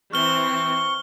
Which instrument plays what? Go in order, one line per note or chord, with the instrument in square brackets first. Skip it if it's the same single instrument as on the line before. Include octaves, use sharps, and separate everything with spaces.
[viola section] E3 C4 [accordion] C#6 [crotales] F6 G7